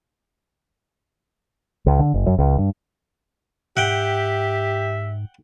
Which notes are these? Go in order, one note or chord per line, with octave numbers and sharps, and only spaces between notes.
C#2
D3
F#1
F#2
C#2
G2
G#2 G4 E5 F#5 G5